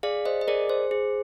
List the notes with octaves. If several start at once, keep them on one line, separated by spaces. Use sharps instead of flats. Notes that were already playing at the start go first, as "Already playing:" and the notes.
G#4 D5 F5
C5 D#5
D#5
G#4 A#4 D5
C5
G#4